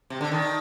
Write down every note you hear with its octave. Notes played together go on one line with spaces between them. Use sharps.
C3
D3
D#3